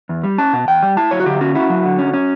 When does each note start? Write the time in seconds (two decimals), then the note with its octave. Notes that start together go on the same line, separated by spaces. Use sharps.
0.09 E2
0.23 G3
0.38 C#4 A5
0.53 B2
0.68 E2 G5
0.83 G3
0.97 E4 A5
1.11 F#3 C#5
1.20 F#4
1.26 D3 G4
1.41 C#4 F#4
1.55 E4 F#4
1.70 F#3
1.85 D3
1.99 C#4
2.14 C#4